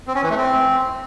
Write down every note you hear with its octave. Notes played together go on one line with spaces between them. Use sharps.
C4
C#4
E3
A3
C4